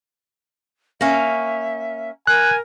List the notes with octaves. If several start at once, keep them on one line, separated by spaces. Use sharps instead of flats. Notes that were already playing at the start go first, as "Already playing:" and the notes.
A#3 C#4 E5
A#4 G#5 F#6